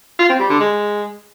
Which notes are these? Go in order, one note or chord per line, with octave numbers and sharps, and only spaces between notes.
F4
C4
G3
D3
G#3